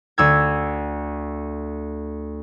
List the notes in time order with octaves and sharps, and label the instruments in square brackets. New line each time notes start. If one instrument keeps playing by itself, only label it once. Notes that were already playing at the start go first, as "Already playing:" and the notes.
[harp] D2 E6 G#6